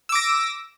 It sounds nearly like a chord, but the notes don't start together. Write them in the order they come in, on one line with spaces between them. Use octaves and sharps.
E6 D6 A#6